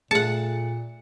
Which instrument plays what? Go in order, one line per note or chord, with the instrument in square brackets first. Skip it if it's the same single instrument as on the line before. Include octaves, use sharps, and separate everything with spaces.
[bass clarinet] A#2 [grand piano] A3 G#4 [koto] F#5 A5 [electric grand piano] C#7